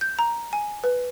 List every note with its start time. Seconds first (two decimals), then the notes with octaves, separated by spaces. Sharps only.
0.01 G6
0.19 A#5
0.53 G#5
0.84 B4